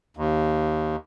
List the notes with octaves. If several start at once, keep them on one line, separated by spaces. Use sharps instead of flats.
D#2